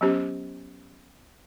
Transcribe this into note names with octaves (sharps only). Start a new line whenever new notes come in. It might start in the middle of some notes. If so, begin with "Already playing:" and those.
F#3 B3 C#4 G4 C5